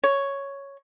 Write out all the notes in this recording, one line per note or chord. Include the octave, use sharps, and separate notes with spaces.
C#5